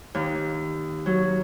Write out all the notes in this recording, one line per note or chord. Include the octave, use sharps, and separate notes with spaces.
D#2
F#3